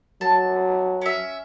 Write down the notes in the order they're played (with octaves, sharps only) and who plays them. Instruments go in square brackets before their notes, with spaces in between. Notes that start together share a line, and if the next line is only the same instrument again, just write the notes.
[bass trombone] F#3 [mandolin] A5
[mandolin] C#4 E5